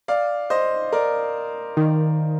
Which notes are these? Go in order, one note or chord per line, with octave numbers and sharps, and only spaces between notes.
D5 F5
C5 D#5
A#4 D5
D#3